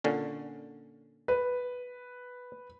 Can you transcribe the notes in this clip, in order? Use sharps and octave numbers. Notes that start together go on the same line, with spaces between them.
A#2 D3 C#4
B4